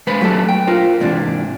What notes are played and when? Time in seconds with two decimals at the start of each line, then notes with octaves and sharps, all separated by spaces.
0.07 G#3 B4 C5 B5
0.21 F#3 A3 G4 A4 A5
0.49 G5
0.67 F4 A#4 C5
1.00 G#2 C3 E3 D4